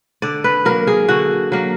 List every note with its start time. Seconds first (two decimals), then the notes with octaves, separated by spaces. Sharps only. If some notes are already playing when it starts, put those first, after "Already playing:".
0.22 D3 D5
0.44 B4
0.65 F#3 A#3 A#4
0.87 G#4
1.08 D3 F#4
1.52 F#3 A#3